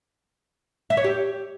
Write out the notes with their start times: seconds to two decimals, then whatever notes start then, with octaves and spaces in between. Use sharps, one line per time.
0.90 E5
0.97 C#5
1.04 G4